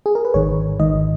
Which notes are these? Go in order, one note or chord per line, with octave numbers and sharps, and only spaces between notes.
G#4
A#4
B4
G#1 G#2 D#3 C#5
G#1 G#2 D#3 D#5